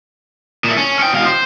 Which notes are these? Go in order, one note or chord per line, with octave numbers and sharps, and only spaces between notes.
A#2 A3
C#4
C#4 G5
B2 F5
C5